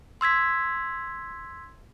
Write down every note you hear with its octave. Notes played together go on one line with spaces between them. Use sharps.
C6 E6 G#6 B6